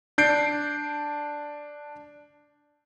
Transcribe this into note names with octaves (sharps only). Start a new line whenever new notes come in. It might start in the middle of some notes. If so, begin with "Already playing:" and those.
D4 G6 C7 D7